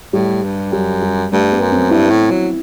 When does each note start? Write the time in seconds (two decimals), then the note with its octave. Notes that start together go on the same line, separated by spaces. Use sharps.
0.13 A2 G3
0.43 G2
0.72 F#2 G3
1.02 G3
1.32 G2 A3
1.52 B3
1.62 F#2
1.72 C4
1.91 G2 E4
2.10 A2
2.30 F#3